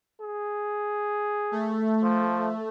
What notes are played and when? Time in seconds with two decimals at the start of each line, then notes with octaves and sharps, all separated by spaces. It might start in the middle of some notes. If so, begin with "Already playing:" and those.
0.21 G#4
1.51 A3
2.03 F3